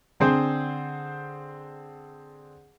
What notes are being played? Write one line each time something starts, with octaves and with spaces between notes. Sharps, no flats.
D3 C4 G#4 C5